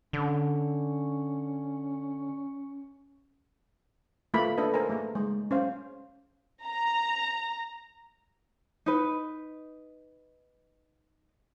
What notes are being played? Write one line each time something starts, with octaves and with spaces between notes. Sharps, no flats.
D3 C#4
A3 A#3 F4 B4 B5
D4 A4 B4 D#5
A#4 C5 G#5 A#5
A3 A#3 G#4 A#5
G#3
C#4 C5 F5
A#5
D#4 B4